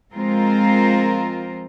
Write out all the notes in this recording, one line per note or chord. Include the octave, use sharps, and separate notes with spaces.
F3 G#3 C4 F4 A#4 C5